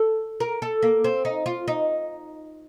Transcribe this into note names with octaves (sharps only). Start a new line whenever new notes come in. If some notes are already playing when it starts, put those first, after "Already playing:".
Already playing: A4
A#4
A4
A#3
C4
D#4
F4
D#4